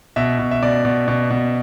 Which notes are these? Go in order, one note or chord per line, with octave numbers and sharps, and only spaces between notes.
B2 E5
B2
E5
B2 D5
B2
B2
B2